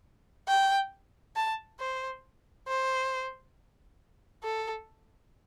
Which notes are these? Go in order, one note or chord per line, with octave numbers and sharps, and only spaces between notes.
G5
A5
C5
C5
A4